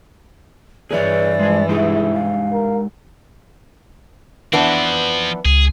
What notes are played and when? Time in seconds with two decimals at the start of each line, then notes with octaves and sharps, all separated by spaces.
0.91 G2 E3 G#4 B4 C#5 D5
1.39 F3 G#3 G#4
1.69 G#3 D#4 E4 G4 G#4
2.13 F5
2.53 A#4
4.53 E3 F3 B3 C4 D4
5.45 C#2 G#4